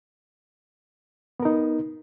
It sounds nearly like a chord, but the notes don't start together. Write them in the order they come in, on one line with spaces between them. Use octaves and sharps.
B3 A#4 D#4